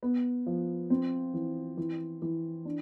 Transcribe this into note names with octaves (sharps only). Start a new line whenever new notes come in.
B3
F3
C4
E3
E3
E3
D4